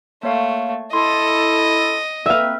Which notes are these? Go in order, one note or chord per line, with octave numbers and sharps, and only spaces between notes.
A3 A#3 C#5 F5
E4 A4 D#5 C6
A#3 C4 B4 E5 F5